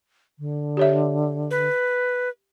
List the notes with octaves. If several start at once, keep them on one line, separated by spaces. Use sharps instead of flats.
D3
G4 C#5 E5
B4